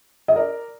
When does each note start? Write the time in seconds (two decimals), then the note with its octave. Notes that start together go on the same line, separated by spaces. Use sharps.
0.28 D#5
0.36 A#4 D5